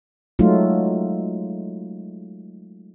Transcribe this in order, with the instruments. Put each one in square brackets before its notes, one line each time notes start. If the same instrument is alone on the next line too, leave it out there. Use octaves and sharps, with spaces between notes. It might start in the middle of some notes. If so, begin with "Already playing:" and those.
[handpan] F#3 G#3 A3 D#4 F4